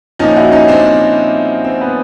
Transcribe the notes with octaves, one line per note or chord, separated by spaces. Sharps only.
A#2 F3 C#4 D#4
E4 F#4
C#4 D#4
C4 D4
C4
B3